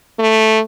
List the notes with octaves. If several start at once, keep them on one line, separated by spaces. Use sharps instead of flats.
A3